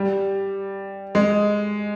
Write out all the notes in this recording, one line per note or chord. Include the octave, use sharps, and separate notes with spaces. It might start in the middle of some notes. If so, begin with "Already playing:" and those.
Already playing: G3
G#3